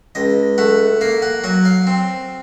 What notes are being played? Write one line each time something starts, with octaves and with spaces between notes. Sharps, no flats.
C#2 D#5
A3 F#5
A#3 F5
F#5
F#3 F#5
F5
C4